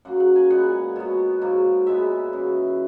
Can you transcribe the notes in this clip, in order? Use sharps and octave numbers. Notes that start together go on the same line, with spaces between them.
F#2 C#3 F#3 A#3 F#5
F#5
G#5
A#2 G#3 B3 F#5
B2 F#3 B3
G#2 F#3 A#3
A#2 G#3 B3 E5
F#2 C#3 E3